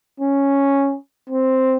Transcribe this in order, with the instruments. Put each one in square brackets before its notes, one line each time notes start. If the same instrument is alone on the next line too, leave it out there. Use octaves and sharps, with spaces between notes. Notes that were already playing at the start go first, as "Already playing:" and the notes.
[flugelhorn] C#4
C4